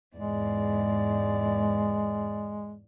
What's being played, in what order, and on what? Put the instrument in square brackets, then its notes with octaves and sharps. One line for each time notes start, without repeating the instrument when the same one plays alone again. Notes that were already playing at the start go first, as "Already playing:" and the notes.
[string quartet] E2 G#2 D5 [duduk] G#3